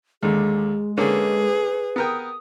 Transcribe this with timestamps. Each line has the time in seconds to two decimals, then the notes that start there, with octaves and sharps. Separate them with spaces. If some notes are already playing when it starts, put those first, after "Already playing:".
0.23 D#2 D3 G#3 G#4
0.98 D3 A#3 C#4 G#4 B4
1.96 B3 A#4 G5 D#6